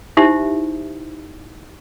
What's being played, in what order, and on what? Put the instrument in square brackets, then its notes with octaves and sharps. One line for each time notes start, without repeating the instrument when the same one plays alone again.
[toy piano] D#4 E4 G4 C5 E5